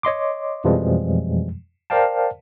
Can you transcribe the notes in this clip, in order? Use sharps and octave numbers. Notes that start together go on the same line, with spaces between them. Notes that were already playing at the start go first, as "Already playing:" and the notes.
C#5 D#5 C6 D6
F2 B2 E3 F3 G3 G#3
A#4 C5 D5 F5 G5 A5